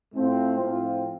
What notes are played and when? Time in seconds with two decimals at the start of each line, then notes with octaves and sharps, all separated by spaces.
0.13 A2 A3 C4 F4
0.59 A2 F3 C4 F4